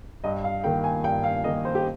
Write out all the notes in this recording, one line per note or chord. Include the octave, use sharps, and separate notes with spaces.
G2 D#5
F5
D#3 A#3 G5
G#5
G2 G5
F5
D#3 A#3 D#5
C5
G4